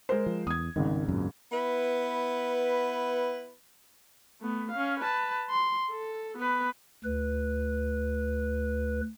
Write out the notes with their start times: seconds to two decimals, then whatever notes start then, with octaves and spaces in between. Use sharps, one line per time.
0.09 G#3 A#4 C5
0.26 F3
0.47 E2 D#6 G#6
0.76 G#1 C#2 G#2 D#3
1.08 F#2 A#2
1.52 B3 E4 B4
4.41 A3 B3
4.71 C#4 F5
5.00 B4 A5
5.50 C6
5.91 A4
6.38 B3 B4
7.04 D2 B4